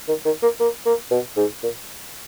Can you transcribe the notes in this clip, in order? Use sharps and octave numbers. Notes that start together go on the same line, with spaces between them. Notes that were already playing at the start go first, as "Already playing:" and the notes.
D#3
D#3
A#3
A#3
A#3
B2
G#2
A#2